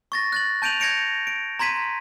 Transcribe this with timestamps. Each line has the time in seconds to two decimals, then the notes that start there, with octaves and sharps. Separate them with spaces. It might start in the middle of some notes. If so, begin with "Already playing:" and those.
0.12 C#6 A6 A#6
0.32 F#6 A6 F#7
0.62 A5 G6 D7 D#7 F7 F#7
0.80 G6 G#6 A#6 C#7 D7 F7
1.27 D7
1.59 A#5 C6 G#6 B6 D#7